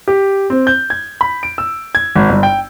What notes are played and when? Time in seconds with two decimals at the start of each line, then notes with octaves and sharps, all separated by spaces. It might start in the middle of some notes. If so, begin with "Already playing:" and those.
0.08 G4
0.50 C4
0.67 G6
0.90 G#6
1.21 B5
1.43 D7
1.58 E6
1.95 G#6
2.16 G#1
2.29 G1
2.43 G5